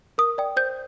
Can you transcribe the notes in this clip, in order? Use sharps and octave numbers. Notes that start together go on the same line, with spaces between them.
A#4 D#6
D5 G5
C5 G6